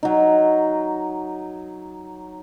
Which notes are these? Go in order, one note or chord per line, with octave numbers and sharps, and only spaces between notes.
F#3 D#4